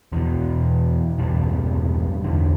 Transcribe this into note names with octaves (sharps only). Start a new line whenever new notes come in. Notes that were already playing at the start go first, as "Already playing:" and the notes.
E2 B2 E3
E2 G2 B2 G3
E2 D3 E3